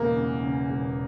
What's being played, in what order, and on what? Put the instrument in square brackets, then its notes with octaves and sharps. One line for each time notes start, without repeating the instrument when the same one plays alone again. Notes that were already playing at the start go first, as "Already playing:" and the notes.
Already playing: [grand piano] E1 E2 C#3 [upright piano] A#3
[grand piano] C#3
C#3
E1